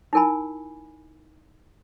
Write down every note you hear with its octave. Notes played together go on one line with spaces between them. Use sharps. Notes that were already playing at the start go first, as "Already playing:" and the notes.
D#4 E4 A#4 G#5 B5